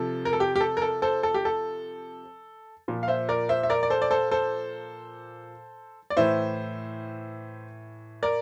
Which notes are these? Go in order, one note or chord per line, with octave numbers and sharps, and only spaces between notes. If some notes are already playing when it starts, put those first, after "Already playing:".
Already playing: C3 F3 A4
A#4
A4
G4
G4
A4
A#4
A4
A4 C5
A4
G4
A4
A#2 F3
F5
C5 E5
A#4 D5
C5 E5
E5
A#4 D5
D5
A4 C5
D5
A4 C5
A4 C5
D5
A2 E3 C5 E5
A#4 D5